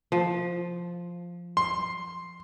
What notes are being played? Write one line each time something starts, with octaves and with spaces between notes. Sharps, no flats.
F3
C6